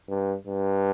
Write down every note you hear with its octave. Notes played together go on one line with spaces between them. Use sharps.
G2
G2